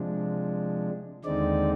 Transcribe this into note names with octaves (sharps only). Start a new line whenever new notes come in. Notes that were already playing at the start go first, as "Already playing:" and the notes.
Already playing: C3 F3 G#3 D4
D#2 D3 G#3 C4 D#4 D5